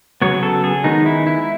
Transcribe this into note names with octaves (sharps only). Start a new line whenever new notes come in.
C#3 F#3 B3 C#5
A4
G#4
D#3 G#3 B3 D#4
E4
E4